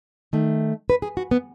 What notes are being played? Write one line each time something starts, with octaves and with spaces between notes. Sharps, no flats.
D#3 A3
B4
G#4
F#4
B3